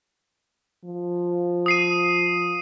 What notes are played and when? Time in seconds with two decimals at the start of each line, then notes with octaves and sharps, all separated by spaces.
0.85 F3
1.66 D#6 C7 D#7